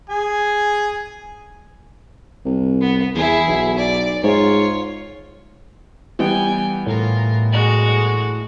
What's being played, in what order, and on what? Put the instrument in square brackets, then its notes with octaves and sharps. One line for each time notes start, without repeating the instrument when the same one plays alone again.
[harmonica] G#4 G#5
[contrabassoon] C2
[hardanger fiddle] B3
[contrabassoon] E2 [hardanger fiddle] E4 G#4
[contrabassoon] B1
[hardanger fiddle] D5
[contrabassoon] G#2 [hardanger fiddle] F4 C#5
[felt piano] E3 G3 B3 [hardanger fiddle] G5 G#5
[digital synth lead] A2 [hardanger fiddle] F4 A#4
[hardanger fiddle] G#3 F#4